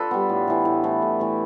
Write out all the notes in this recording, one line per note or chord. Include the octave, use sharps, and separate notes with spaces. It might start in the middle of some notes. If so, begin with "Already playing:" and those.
Already playing: D4 F4 A4 B4
G3 B3
A2
E3 A3
A2
E3 A3
A2
E3 A3